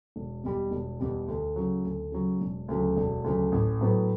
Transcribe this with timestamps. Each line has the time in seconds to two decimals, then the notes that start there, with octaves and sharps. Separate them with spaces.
0.16 E1
0.43 E2 B2 G3
0.71 E1
1.00 E2 B2 G3
1.28 D2
1.56 C#3 F#3
1.84 D2
2.12 C#3 F#3
2.40 E1
2.68 D2 C#3 F#3
2.96 E1
3.24 D2 C#3 F#3
3.52 A1
3.81 A2 F#3 B3